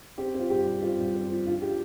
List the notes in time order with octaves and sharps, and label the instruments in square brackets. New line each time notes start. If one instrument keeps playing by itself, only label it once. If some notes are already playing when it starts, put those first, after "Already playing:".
[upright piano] C4 G4
C4 F4
G2 G4
G2
C4 F4
G2
C4
F3
D4 F4
D4 G4